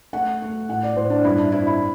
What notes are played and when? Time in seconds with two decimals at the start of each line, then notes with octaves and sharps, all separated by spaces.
0.13 A3 F#5
0.42 A3
0.69 A2 F#5
0.83 D5
0.96 A2 C5
1.10 D4
1.24 G2 E4
1.38 D4
1.52 C4 E4
1.67 E4